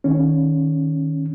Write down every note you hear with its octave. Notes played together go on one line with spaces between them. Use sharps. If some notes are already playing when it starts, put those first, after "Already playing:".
D#3 C#4